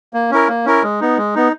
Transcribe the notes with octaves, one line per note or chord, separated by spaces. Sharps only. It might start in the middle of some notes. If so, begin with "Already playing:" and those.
A#3
C#4 E4 A#4
A#3
C#4 E4 A#4
G#3
B3 D#4
G#3
B3 D#4